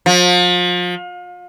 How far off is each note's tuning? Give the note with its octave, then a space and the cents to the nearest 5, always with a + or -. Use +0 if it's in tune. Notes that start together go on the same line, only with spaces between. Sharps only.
F3 +35